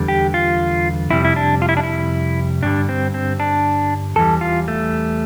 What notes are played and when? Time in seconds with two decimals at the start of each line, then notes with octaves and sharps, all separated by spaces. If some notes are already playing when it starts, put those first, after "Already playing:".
Already playing: E2 D3 G3
0.08 G4
0.34 F4
1.10 F2 C3 G3 E4
1.25 E4
1.36 D4
1.62 F4
1.69 E4
1.77 D4
1.83 E4
2.63 G2 D3 G3 D4
2.89 C4
3.14 C4
3.40 D4
4.16 E2 E3 G3 A4
4.41 F4
4.68 A3